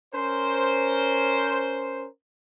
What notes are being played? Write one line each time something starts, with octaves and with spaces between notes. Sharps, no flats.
C#4 A#4 C5